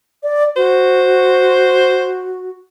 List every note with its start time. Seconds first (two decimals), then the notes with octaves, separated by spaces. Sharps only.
0.23 D5
0.56 F#4 C5